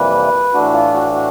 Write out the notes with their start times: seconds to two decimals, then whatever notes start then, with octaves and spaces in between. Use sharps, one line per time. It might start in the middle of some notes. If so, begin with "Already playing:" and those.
Already playing: F2 C3 E3 G3 A#3 B4
0.54 A2 E3 A3 D4 F#4
0.73 F4
0.93 F#4
1.14 F#4